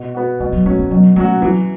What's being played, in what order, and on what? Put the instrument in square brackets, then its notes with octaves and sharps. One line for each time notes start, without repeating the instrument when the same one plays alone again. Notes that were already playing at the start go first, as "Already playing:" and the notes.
Already playing: [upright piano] B2
B3 F#4
[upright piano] B2 [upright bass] E3
[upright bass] F#3
[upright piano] F#3 C#4 [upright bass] A3
[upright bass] B3
[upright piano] B2 [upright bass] F#3
[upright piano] F#3 C#4 F#4 [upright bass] A3
[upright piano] E3 [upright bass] F#3